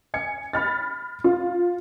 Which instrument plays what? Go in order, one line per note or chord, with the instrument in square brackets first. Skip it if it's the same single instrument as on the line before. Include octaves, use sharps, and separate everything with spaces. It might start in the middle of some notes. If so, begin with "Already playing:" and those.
[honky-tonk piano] G#5 G#6 C#7
B5 F6 A6
F4